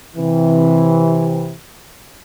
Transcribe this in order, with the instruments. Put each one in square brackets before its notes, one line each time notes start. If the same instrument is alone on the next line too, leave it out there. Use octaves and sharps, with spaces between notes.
[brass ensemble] C3 E3